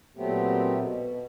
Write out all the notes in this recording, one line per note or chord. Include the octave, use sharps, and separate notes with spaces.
A#2 F#3 A3 B3 C4 G4
B2